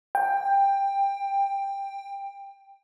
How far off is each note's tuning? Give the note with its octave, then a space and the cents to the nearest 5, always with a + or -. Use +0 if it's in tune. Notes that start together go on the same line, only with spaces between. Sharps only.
G5 +15